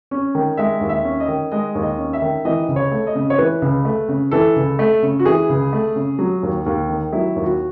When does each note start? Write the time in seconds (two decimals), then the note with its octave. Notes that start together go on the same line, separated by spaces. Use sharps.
0.11 C#4
0.35 D#3
0.57 G#3 E5
0.81 D#2
0.89 E5
1.05 C#4
1.20 D#5
1.28 D#3
1.52 G#3 D#5
1.75 D#2
1.83 D#5
1.98 C#4
2.13 E5
2.22 D#3
2.45 E3 D#5
2.68 C#2
2.76 C#5
2.92 A3
3.07 D#5
3.15 C#3
3.30 C#5
3.38 E3 B4
3.62 C#2
3.85 A3
4.09 C#3
4.31 E3 A4
4.56 C#2
4.79 A3
5.02 C#3
5.19 F#4
5.26 E3 G#4
5.49 C#2
5.73 A3
5.96 C#3
6.19 F#3
6.43 D#2
6.66 D#2
6.89 D#3
7.13 F#3 E4
7.36 D#2
7.44 F#4